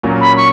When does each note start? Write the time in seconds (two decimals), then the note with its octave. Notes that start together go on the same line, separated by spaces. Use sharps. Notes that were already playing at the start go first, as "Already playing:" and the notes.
0.03 A#2 F#3 A#3 C#4
0.21 B5
0.37 C#6